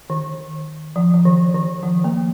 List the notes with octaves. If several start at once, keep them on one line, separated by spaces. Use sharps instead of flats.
D#3
F3
F3
D#3
D#3
F3
A#3